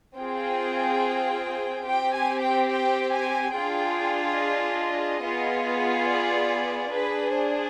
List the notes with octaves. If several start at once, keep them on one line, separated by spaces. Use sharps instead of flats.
C4 F4 G#4 G5
C4 G4 G5
G#5
G5
G5
G#5
D4 F4 G#4 G5
D#5
B3 F4 G#4
D5
D4 G#4 B4
C5